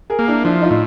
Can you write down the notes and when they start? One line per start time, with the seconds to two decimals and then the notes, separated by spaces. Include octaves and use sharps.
0.10 G#4 A#4
0.19 A#3
0.28 D4 E4
0.45 F3 D4 E4
0.62 D#4 F4
0.70 A2